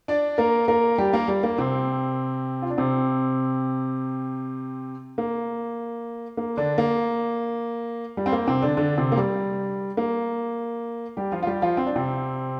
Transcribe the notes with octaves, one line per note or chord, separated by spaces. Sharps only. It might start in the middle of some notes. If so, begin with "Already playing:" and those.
D4 D5
A#3 A#4
A#3 A#4
G3 G4
A#3 A#4
G3
A#3
C3 C4
F4
D4
C3 C4
A#3
A#3
D3 D4
A#3
G3
C4
A#3
C3 C4
D3 D4
D3 D4
C3 C4
A#3
G3
A#3
G3 G4
F3 F4
F4
G3 G4
F3 F4
C4
D4
C3 C4